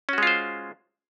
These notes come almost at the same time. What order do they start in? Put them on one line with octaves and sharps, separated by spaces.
C#4 F#4 G#3 F4 C5